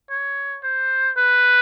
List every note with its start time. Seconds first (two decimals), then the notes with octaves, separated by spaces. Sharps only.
0.10 C#5
0.63 C5
1.18 B4